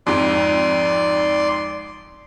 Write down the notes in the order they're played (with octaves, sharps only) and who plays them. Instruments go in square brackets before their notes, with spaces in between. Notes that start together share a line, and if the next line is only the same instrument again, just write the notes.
[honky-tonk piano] F2 G#2 [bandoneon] D5 C6